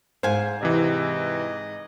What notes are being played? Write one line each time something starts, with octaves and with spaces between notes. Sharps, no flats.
G#2 C5 F5 G#5
C3 E3 D#5